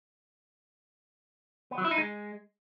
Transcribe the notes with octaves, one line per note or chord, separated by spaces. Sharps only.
B3
F#3
E4
D#4
G#3